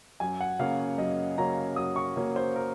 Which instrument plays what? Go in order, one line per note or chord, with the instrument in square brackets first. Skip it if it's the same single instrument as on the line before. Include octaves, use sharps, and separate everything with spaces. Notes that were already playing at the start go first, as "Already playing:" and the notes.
[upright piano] F#2 G#5
F#5
C#3 F#3 A#3 C#4 F5
F#2 D#5
C#3 F#3 A#3 C#4 A#5
F#2 D#6
C#6
C#3 F#3 A#3 C#4
C5
A#4